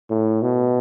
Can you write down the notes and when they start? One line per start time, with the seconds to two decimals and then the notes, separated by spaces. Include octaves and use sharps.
0.10 A2
0.42 B2